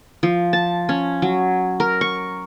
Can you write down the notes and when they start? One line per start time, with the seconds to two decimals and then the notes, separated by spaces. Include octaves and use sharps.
0.23 F3
0.53 A5
0.89 C#4
1.22 F#3
1.80 A#4
2.01 C#6